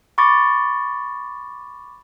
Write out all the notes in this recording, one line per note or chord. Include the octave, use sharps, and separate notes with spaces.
B5 C#6 D6 A6